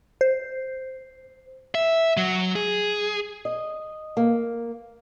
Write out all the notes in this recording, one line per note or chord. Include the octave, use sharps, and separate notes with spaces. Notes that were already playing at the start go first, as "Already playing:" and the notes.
C5
E5
F#3
G#4
D#5
A#3